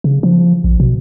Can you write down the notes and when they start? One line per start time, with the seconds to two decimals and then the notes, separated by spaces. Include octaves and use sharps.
0.04 C#3
0.23 F3
0.64 A#1
0.80 B2